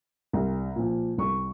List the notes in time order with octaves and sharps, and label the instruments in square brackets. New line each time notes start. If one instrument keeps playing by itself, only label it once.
[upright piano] C2
A#2 F3
C2 C#6